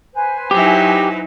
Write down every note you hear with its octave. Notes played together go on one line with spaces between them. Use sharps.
B4 C5 G#5
F#3 D#4 E4 G4